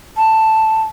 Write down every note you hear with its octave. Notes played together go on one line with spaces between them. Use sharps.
A5